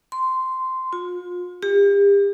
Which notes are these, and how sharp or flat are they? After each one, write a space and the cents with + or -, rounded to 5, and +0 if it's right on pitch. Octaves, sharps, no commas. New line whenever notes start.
C6 -10
F4 +40
G4 +40